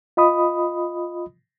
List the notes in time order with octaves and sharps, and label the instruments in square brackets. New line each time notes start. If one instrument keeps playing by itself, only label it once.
[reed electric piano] F4 D#5 B5 D#6